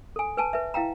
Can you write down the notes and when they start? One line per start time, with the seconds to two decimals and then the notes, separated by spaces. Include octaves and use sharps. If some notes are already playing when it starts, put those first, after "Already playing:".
0.16 A4 G#5
0.37 B4 G#5 A5
0.53 B4 E5
0.74 E4 F5 G5 A#5